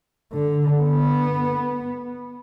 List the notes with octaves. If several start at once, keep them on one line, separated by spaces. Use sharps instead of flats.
D3
B3